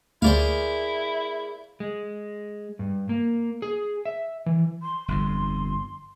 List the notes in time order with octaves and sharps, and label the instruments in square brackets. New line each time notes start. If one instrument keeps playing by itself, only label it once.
[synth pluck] D2 [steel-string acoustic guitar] A#3 G#4 [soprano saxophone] E4 [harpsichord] C5 D5 F5
[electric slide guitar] G#3
G2
A#3
G#4
E5
E3
[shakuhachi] C6
[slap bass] G1 F2 [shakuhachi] C6